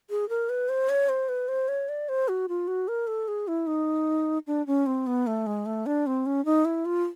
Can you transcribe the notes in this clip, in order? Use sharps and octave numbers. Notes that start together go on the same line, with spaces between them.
G#4
A#4
B4
C5
C#5
C5
B4
C5
C#5
D5
C5
F#4
F4
F#4
A#4
A4
G#4
E4
D#4
D4
C#4
C4
B3
A3
G#3
A3
D4
C4
C#4
D#4
E4
F4